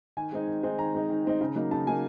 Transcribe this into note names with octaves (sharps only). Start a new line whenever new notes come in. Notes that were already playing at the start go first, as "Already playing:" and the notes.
D#3 G#5
G#3 C4 D#4
D#3
G#3 C4 D#4
D#3 A#5
G#3 C4 D#4
D#3
G#3 C4 D#4
C#3
F#3 A#3 D#4
C#3 A5
F#3 A#3 D#4 G#5